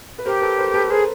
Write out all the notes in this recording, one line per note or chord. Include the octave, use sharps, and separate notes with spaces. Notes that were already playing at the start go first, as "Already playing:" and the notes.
B4
G4 A#4 C5
A4 B4
A#4 C5
A4 B4
G#4 A#4 C5